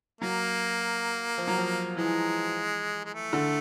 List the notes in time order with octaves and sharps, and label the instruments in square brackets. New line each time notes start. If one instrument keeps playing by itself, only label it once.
[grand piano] F#3 [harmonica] A#3
[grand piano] F3
F#3
F3
[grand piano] E3 [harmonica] G#3
[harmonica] G#3
A3
[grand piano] D3